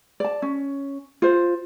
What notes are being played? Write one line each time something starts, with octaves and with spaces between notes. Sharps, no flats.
D5 A5
C#4
F4 C5